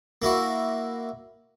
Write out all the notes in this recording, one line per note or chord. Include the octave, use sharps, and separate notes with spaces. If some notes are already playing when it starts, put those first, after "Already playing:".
A#3 E4 F#4